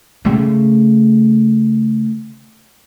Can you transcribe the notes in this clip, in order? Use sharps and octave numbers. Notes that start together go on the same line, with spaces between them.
C#3 A3